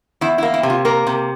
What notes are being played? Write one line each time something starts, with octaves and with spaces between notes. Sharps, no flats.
E2 E4
E4
A#3
E4
C3
F4
A#3 A#4
C3